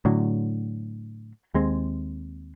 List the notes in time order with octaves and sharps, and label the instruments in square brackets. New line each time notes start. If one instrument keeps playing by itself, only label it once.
[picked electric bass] A2 D3 F#3
D#2 G#3 C4